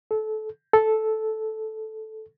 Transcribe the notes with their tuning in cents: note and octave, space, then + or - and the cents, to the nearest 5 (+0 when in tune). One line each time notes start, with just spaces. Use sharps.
A4 -25
A4 -10